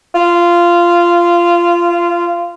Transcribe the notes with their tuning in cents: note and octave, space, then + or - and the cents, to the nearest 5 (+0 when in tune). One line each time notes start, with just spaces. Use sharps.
F4 -15